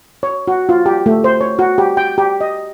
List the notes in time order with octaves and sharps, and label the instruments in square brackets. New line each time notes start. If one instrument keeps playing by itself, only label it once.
[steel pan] C#5
F#4
F4
G4
A3
C5
C#5
F#4
G4
G5
G4
D#5